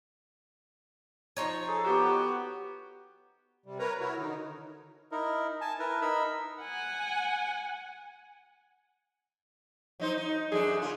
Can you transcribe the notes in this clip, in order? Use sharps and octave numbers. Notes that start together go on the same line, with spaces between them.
F3 D#4 C#5
G#4 A4
B3 F#4 G4
C3 G3
A#4 B4 C#5 A#5
E4 F#4 A#4 C#5
D3 D#3 D#4
D#4 E4 A#4
G#5 A5
E4 A#4 B4
D#4 A#4 B5 E6
F#5 G#5
F#3 D#4 C5
D#4
F#2 D4 G#4 A4
C#3 F4